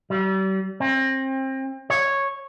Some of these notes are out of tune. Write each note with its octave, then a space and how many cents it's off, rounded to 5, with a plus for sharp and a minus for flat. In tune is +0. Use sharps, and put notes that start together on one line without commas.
G3 -40
C4 +30
C#5 -5